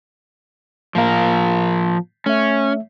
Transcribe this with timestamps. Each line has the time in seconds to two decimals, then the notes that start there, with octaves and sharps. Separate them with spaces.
0.95 A2 F3 A#3 A#4 F5
2.26 A3 C#4 E5